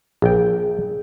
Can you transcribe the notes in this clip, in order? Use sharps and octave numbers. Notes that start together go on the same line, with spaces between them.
A#1 G#4 G5